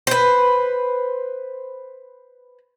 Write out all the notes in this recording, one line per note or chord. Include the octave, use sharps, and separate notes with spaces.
B4 C5